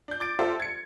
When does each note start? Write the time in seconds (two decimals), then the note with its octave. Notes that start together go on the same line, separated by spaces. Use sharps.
0.08 D4 G6
0.20 D6 A6 D7
0.39 D4 F4 G4 A4 C5 E5
0.60 G#6 C#7